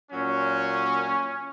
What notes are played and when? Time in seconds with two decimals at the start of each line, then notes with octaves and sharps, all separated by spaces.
0.11 A#2 F#3 C#4